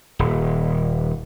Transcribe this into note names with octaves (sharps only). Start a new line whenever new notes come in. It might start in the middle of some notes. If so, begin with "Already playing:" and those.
D#1